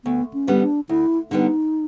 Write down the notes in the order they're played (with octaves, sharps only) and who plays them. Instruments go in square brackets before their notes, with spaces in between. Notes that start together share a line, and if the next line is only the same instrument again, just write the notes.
[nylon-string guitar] D2 [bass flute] B3
[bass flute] C#4
[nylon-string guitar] D3 G3 B3
[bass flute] D4
[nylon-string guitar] D2 [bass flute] E4
[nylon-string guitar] D3 G3 B3 [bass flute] D#4